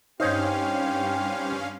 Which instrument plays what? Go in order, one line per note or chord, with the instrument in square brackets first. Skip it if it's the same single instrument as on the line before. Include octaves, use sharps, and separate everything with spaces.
[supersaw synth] G2 C#4 F5 [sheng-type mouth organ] C4 G4 [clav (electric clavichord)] D#4 C5 C#5